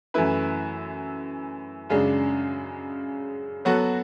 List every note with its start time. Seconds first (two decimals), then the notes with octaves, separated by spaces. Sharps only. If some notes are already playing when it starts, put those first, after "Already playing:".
0.14 F#2 E3 A3 E4 B4
1.90 F#2 C#3 G#3 D4
3.65 F#3 B3 F#4 A4